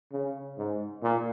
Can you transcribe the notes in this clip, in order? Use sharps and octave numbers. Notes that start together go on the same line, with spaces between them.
C#3
G#2
A#2